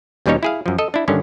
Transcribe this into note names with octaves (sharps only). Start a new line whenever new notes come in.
D#2 B2 G3 C#4 D#4 C#5
E4 G#4 F5
F#2 F3
A4 D#5
D4 E4
G2 D3 D#3 C#4